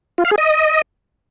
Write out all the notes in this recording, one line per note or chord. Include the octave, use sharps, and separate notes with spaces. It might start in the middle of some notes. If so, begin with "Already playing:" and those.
F4
F5
G#4
D#5